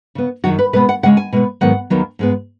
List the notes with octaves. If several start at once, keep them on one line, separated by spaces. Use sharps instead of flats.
C#3 B3
F#2 D#3 F#3 F#4
B4
B2 G#3 B3 B4
F#5
C#3 G#3 C#4 F#5
G#5
B2 G#3 B3
G#2 D#3 F#3 B3 F#5
D#2 D#3 F#3 B3
G#2 G#3 B3